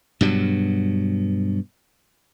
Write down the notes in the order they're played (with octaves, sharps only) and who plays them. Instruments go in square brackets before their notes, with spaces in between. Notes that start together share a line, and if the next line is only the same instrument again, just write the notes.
[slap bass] G2 B2 F#3